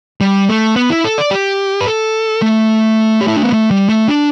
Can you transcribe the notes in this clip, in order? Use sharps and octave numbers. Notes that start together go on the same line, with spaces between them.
G3
A3
B3
E4
A4
D5
G4
B4
A4
A3
G4
E4
D4
B3
A3
G3
A3
D4